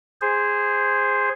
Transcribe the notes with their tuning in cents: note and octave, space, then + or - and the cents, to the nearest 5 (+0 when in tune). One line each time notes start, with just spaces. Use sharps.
G#4 -10 C5 +0